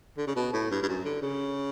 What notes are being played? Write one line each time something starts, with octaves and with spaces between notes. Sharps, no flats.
D3
C#3
B2
A2
G2
G2
F#2
D3
C#3